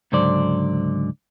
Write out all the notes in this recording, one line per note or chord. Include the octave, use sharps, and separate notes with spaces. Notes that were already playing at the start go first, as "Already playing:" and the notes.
C#2 G#2 D3 F#3 C5 D5